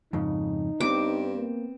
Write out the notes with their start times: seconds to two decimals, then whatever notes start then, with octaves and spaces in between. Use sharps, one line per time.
0.13 F2 G#2 C#3 D#4
0.80 G2 B3 C4 D6
1.36 A#3